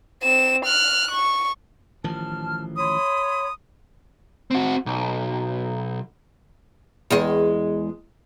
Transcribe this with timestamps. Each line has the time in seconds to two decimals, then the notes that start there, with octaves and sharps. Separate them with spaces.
0.23 C4 E7
0.65 F6 F#6
1.11 C#6
2.04 A1 D#3 F3 A5 F6
2.76 C#5 B5 C6 D#6
4.51 C4 F#4
4.86 B1
7.10 E2 G#3 D#5